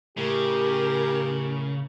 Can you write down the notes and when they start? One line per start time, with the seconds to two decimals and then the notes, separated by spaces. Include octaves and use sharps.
0.18 A2 C#3 G4 A#4